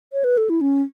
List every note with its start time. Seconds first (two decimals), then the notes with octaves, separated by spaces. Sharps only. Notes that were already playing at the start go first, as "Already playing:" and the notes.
0.13 C#5
0.24 B4
0.37 A4
0.50 E4
0.61 C#4